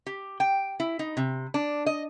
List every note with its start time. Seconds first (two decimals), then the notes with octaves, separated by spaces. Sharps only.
0.06 G4
0.40 G5
0.80 E4
0.99 D#4
1.17 C3
1.54 D4
1.86 D#5